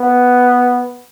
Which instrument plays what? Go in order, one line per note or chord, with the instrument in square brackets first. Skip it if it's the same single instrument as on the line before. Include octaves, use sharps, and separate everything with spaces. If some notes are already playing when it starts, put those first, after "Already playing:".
Already playing: [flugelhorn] B3